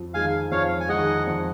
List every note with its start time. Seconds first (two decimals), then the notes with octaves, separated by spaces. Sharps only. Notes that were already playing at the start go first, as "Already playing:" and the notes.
Already playing: F2
0.14 D#3 G#3 F5 G#5
0.51 F2 C#5 F5
0.80 G#5
0.88 D#3 G#3 D#5 F#5
1.27 F2